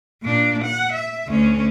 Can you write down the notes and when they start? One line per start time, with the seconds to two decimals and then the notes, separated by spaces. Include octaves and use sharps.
0.23 A#2 D4
0.64 F#5
0.92 E5
1.28 D2 C#4